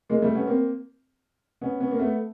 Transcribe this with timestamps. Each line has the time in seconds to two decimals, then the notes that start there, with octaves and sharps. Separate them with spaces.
0.10 G#3 A#3
0.22 G3 A3
0.34 B3 C#4
0.47 A#3 C4
1.61 B3 C#4
1.80 B3 C#4
1.91 A#3
1.99 A3 B3